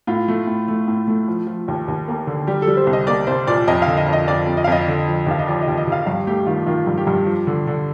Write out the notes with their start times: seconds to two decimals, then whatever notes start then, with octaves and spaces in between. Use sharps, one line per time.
0.07 A2 F4
0.28 A3
0.47 A2
0.68 A3
0.88 A2
1.07 A3
1.28 F3
1.47 F3
1.68 D#2
1.88 D#2
2.08 A#3
2.27 D3
2.47 G3 G4
2.62 A4
2.67 G3
2.77 C5
2.87 C2
2.93 D#5
3.07 A#3 D5
3.27 C2 C5
3.47 A#2 D5
3.68 F2 D#5
3.82 D3 F5
3.97 D#5
4.08 F2
4.13 D#5
4.27 F2 D5
4.47 F2
4.57 D#5
4.64 F5
4.67 F2 D#5
4.88 D3
5.08 F3
5.27 D#2 F5
5.39 D#5
5.47 F3 D5
5.62 D#5
5.68 D#2
5.77 D#5
5.87 D#2 F5
6.07 G2 F5
6.27 A3 G4
6.47 D#3 F4
6.67 D#3 F4
6.87 G2
6.97 G4
7.07 G2
7.27 F3
7.47 D3
7.67 D3